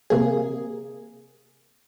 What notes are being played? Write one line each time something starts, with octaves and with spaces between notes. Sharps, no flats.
C3 A#3 G#4